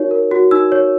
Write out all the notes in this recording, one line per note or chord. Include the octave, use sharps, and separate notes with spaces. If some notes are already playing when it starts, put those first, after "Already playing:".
Already playing: D#4 F#4 A#4 C#5
A#4
F#4
D#4 E6
C#5